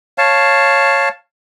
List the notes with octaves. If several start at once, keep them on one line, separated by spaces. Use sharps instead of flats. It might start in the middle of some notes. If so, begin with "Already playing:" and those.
C#5 F5 A5